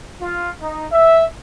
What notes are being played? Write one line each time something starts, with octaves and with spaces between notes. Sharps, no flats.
F4
D#4
E5